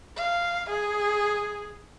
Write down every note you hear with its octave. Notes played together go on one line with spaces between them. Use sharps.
F5
G#4